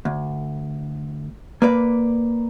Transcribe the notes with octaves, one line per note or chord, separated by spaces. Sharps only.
D2
A#3 B4 D5